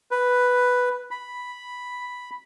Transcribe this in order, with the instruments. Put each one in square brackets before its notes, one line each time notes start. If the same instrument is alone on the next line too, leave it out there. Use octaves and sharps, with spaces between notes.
[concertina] B4
B5